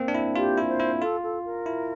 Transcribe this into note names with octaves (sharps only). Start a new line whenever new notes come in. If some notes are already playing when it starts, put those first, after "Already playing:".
Already playing: A#3 C4
D4
E4
F4 G4
E4
C5
E4
F4 A4
A4
A#4
E4